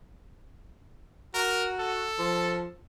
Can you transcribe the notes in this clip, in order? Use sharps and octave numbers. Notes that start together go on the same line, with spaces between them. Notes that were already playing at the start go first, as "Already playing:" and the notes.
F#4 A#4
A4
F3